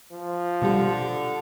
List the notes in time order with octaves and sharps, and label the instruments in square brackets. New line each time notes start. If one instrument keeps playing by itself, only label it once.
[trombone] F3
[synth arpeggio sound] B2 G3 G4 [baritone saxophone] D3